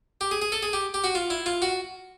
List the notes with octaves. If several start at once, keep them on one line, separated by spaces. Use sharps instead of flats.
G4
G#4
G#4
A4
G#4
G4
G4
F#4
F4
E4
F4
F#4